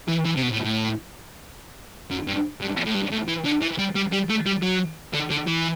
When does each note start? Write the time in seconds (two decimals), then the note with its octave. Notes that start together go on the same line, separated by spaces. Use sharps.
0.08 E3
0.26 E3
0.37 C3
0.43 B2
0.53 A2
0.64 A2
2.11 F#2
2.27 G2
2.61 G2
2.86 A2
2.95 G2
3.12 A2
3.28 E3
3.45 D3
3.62 E3
3.79 G3
3.96 G3
4.13 G3
4.30 A3
4.46 G3
4.63 F#3
5.14 D3
5.31 D3
5.47 E3